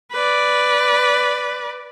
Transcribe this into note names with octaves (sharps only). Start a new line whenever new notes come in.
B4 D5